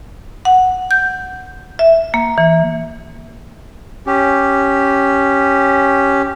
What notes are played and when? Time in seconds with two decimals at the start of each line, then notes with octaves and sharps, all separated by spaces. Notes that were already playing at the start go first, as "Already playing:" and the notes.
0.45 F#5
0.91 G6
1.79 E5
2.14 A#3
2.38 E3
4.07 C#4 G4